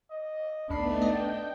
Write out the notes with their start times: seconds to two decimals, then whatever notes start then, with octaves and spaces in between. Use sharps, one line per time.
0.10 D#5
0.70 A1 D2 A3 B3 D4 D#4 B5 C7
1.02 A3 D#5 G5